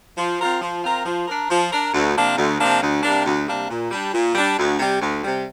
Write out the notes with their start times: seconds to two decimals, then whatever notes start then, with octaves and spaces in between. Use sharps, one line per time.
0.18 F3
0.40 C4 F4 A#4
0.61 F3
0.83 C4 F4 A#4
1.06 F3
1.28 D4 A#4
1.50 F3
1.72 D4 A#4
1.94 D2
2.16 C3 F3 A#3 D4
2.37 D2
2.60 C3 F3 A#3 D4
2.82 D2
3.03 C3 G3 A#3 D4
3.26 D2
3.48 C3 G3 A#3 D4
3.70 A#2
3.91 G3 D4
4.13 A#2
4.35 G3 D4
4.58 D2
4.79 C3 G3
5.01 D2
5.23 C3 G3